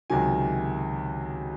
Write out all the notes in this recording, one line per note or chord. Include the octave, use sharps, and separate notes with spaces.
C#2 C3 D#3 F#3 G#5